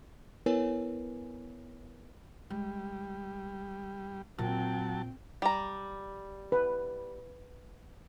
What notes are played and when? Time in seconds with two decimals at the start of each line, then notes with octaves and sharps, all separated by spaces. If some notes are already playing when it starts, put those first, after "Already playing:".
0.46 B3 E4 A#4 B4 C#5 G#5
2.50 G3 G#3
4.38 A#2 F#3 C4 G5 A5
5.42 G3 A#5
6.52 B4